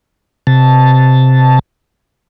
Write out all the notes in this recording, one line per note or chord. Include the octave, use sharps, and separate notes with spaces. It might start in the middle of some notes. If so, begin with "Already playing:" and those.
C3 A5